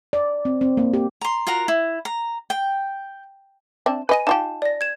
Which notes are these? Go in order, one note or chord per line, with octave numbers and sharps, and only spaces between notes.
D5
C4
C4
A#3
G4
A#5 C6
F4 F#4 A#4 A#5
E4
A#5
G5
C4 D4 E5
B4 D#5 G#5 D#7
D#4 F4 G4 A5
D5 A#6
G#6 E7